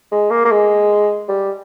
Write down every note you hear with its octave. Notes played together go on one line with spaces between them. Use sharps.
G#3
A#3
A#3
G#3
G3